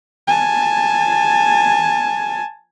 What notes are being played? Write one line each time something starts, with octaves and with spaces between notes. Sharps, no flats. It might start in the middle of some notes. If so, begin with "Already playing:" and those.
G#5 A5